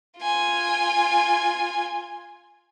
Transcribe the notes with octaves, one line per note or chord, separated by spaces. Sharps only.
F4 G#5